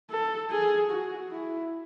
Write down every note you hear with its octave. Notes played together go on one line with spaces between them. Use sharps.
A4
G#4
F#4
E4